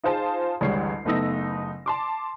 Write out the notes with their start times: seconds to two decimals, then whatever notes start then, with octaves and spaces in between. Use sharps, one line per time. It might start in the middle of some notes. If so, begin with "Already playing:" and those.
0.04 D#4 F4 G#4 C5 A5
0.61 A1 D2 G3 G#3 C#5 C7
1.05 F#1 A3 B3 D#4 E6 A#6
1.86 A5 C6 D6